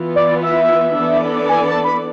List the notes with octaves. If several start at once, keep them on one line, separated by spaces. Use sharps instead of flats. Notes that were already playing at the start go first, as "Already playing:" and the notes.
Already playing: E3 B3 F4
D5
E5
E3 B3 D4 A4 D5
G#5
A5
B5